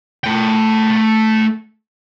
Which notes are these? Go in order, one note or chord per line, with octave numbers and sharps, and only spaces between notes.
A3 G5